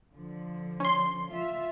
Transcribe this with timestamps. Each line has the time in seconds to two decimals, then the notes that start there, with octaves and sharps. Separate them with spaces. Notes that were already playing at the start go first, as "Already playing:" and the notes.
0.12 D3 F3
0.80 C#4 C6
1.31 F4 E5